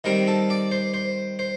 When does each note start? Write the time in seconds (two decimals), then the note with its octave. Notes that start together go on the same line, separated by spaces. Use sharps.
0.04 D#3 G3 C4 A#4
0.27 A4
0.50 D5
0.71 C5
0.94 C5
1.39 C5